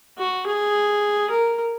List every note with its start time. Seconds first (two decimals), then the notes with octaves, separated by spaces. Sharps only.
0.18 F#4
0.46 G#4
1.30 A#4